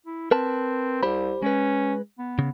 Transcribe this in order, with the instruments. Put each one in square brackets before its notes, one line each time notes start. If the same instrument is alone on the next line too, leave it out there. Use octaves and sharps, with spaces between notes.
[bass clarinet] E4
[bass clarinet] C4 [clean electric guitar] A#4 B4 A5
[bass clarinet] C2 [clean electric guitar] G4 C5 B5
[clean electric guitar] G#3 B4 [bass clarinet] C#4
[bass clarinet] B3
[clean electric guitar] C#3